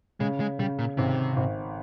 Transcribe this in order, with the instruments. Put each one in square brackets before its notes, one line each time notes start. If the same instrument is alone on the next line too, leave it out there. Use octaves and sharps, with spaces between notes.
[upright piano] C#3 [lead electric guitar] G#3
[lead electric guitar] G#3
[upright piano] C#3 [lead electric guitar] G3
[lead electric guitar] A#2
[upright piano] G#1 [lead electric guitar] C3
[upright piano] G#1